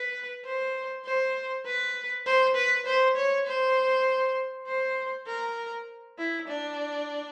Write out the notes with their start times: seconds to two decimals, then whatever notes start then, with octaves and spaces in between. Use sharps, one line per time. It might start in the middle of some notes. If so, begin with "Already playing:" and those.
Already playing: B4
0.45 C5
1.05 C5
1.66 B4
2.26 C5
2.56 B4
2.86 C5
3.16 C#5
3.47 C5
4.67 C5
5.28 A#4
6.18 E4
6.48 D4